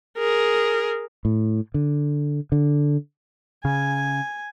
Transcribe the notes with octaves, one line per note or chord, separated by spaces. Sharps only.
G#4 A#4
A2
D3
D3
C#3 G#5